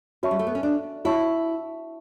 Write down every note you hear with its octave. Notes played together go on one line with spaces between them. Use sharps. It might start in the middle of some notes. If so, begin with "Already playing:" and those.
C#4 F#4 C#5 E5 A5 C#6
G3
A3
B3
C#4
D4
E4 F#4 C#5 E5 A5 C#6